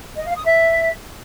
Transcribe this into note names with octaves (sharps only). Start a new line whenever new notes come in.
D#5
F5
D#6
E5